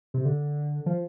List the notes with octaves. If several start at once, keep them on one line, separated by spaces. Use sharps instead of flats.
C3
D3
F3